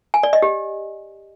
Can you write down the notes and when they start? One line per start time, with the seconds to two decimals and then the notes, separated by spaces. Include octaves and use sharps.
0.14 G#5
0.23 D5
0.33 D#5
0.42 G4